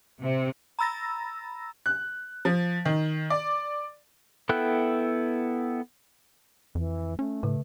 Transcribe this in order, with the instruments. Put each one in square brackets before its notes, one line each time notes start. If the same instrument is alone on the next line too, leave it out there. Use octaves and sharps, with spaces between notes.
[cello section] C3
[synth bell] A#5 B5 E6 A6 A#6
[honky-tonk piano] F#6
F3
D#3
D5
[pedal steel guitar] B3 E4 A4 G5 F#6
[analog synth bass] F2 [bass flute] E3
[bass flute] A3 [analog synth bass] C#4
[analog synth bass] A2 [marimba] C#3